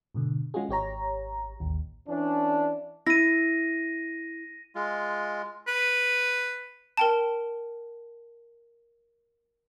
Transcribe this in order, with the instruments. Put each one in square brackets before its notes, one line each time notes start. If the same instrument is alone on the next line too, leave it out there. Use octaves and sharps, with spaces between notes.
[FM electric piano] G#2 B2 D3
G#3 C#4 F4 F#4 G#4
G#1 G4 C#5 A#5
A1 D#2
[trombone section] E3 C#4 D4
[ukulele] E4 [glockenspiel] A#6 D#7
[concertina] G#3 F4
[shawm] B4
[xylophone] A#4 G5 A5